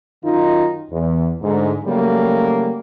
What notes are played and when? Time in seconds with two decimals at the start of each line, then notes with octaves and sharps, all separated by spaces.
0.24 F#2 D#3 D#4 F4
0.91 E2
1.41 D2 G#2
1.85 C#3 F#3 G3 A3 A#3